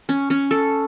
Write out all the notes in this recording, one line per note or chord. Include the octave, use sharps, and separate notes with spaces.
C#4
C#4
A4